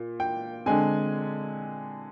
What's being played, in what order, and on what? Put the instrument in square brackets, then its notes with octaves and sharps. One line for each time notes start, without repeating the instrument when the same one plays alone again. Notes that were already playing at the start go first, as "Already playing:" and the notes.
Already playing: [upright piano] A#2
G5
D3 G#3 C4 G#5